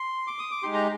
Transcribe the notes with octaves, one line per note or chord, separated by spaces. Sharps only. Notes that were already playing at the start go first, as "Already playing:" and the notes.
Already playing: C6
D6
D#6
D6
G#3 D#4 G4 C6
A#5